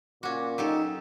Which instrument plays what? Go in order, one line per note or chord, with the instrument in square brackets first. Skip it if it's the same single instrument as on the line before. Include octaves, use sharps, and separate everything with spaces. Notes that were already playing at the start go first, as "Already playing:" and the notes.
[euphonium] A#2 [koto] C#4 F#4 [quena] D6
[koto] F#3 G4 A4 [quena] D#4